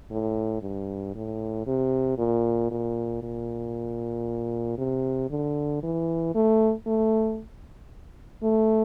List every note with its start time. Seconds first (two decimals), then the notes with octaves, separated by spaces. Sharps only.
0.11 A2
0.62 G2
1.15 A2
1.67 C3
2.18 A#2
2.71 A#2
3.23 A#2
4.78 C3
5.30 D3
5.83 E3
6.35 A3
6.87 A3
8.43 A3